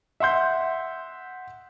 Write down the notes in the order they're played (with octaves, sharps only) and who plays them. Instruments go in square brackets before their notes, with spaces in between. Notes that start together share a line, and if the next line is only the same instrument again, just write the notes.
[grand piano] E5 F#5 C6 G6